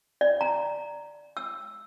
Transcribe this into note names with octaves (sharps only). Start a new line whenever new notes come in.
D5
A#5
E6